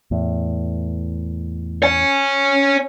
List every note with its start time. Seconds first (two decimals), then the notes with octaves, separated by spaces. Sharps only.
0.11 E2 A2
1.83 C#5 G#5